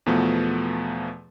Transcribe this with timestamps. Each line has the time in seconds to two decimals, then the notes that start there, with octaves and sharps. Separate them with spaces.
0.06 E2 B2 F3 A3 B3